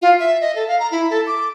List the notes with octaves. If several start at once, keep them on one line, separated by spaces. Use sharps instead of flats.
F4
E5
D#5
A4
F5
A#5
E4
A4
D6